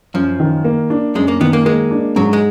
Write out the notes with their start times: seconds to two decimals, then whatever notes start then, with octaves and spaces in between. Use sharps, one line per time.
0.14 F#2 F3
0.40 D#3
0.65 A#3
0.90 D4
1.15 F#2 G#3
1.28 A#3
1.41 D#3 B3
1.53 A#3
1.66 G#3 A#3
1.91 D4
2.16 G#2 F#3
2.33 G#3